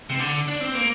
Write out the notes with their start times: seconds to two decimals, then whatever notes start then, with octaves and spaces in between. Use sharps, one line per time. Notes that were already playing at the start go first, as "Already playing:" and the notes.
0.10 C3
0.20 D3
0.48 D4
0.61 C4
0.75 A#3